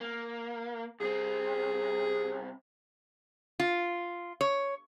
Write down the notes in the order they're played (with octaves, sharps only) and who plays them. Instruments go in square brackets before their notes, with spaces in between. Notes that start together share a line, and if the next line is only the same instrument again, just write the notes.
[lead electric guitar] A#3
[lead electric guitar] C2 C4 [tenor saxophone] G#4
[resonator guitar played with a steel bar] F4
C#5